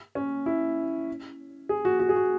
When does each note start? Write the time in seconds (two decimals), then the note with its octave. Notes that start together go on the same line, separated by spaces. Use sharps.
0.15 C#4
0.46 E4
1.69 G#4
1.85 F#4
2.00 F#4
2.09 G#4
2.16 F#4